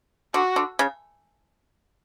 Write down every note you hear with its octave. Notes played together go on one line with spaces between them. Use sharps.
D3 F#4
D3
C#3